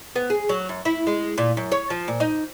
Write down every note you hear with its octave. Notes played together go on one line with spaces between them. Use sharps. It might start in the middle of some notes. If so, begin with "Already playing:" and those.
B3
G#4
F#3
F#2
E4
G#3
A#2
F#2
C#5
F3
A#2
D#4